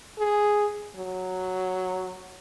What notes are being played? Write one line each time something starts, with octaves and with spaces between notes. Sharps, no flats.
G#4
F#3